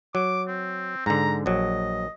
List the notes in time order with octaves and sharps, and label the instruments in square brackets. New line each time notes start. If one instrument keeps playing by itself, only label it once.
[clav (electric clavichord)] F#3 [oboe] D6
[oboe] C4
[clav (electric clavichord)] G#2 D3 [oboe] A#5
[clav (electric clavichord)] A#1 F#3 [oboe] D#5